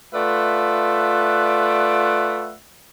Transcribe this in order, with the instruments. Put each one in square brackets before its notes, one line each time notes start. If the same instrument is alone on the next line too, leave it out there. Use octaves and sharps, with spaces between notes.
[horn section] A3 F4 B4 D5 E5 F#5